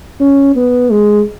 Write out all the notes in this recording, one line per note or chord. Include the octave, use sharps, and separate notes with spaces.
C#4
B3
G#3